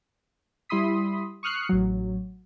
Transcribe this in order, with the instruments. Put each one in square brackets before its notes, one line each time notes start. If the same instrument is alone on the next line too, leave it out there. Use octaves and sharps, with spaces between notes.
[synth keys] G3 E4 B5 C6 D#6 B6
C#6 D#6 F6 F#6 C7 C#7
A1 F#3